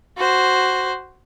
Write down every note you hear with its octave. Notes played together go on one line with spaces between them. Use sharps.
F#4 C5